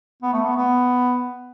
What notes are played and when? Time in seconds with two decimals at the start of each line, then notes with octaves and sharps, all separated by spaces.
0.23 B3
0.33 A3
0.45 B3
0.57 B3